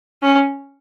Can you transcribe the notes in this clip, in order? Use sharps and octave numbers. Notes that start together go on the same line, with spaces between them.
C#4